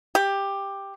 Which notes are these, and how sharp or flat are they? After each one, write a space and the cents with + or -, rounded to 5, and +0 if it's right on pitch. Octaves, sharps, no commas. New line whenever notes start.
G4 +10